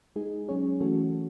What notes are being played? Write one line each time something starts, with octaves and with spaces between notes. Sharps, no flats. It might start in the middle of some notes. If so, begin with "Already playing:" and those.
G#3 D#4 G#4
F#3 C#4 G#4 C#5
E3 A3 C#4 F#4 A4